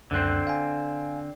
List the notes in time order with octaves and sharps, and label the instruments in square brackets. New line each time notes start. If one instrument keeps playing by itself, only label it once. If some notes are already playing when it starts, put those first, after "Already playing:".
[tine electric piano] C#2 F#2 F#6 [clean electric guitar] D3 C4
[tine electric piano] F5 G#5